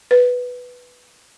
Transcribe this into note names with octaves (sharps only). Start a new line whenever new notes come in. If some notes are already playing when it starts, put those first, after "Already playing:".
B4